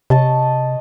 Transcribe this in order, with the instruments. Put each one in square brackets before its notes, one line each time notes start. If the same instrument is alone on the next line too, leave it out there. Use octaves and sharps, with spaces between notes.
[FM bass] C3 [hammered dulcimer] D#5 A5 C#6